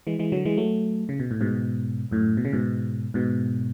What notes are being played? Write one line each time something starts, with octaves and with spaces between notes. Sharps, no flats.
E3 G#3
E3 G#3
D3 F#3
E3 G#3
F#3 A3
C#3
B2
A2
G#2 B2
F#2 A2
B2
C#3
G#2 B2
G#2 B2